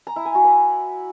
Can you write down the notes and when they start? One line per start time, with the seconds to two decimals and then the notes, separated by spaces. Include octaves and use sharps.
0.07 A#5
0.16 E4
0.25 G#5
0.35 F#4
0.44 B4